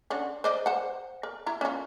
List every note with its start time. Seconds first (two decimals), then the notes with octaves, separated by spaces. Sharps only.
0.10 D3 C#4 F#4
0.44 C5 D5 D#5
0.66 C5 F#5
1.23 A#4
1.46 E4 A#5
1.61 C#4 F4